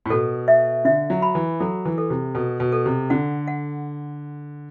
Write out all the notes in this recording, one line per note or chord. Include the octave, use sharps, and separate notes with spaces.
A2
B2 A4
E5
D3 E5
F#3
B5
E3
F#3 A4
E3
A4
C3
B2 A4
B2
A4
C3
D3 F#5
F#5